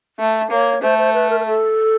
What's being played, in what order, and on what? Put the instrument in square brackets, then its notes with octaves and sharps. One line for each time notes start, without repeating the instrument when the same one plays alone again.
[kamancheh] A3
[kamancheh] A#3 [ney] C#5
[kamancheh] A3 [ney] C5
[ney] C5
B4
A#4
A#4
A4